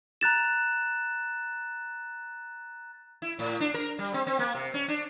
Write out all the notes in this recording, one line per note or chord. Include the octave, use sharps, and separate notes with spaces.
A#5 F#6 A6 E7
E4
A2
D4
A#4
G3
C4
C4
A#3
C3
C#4
D4